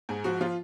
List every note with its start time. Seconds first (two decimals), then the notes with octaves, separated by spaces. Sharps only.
0.09 G#2 G#4
0.24 F3 F#4
0.41 F3 F4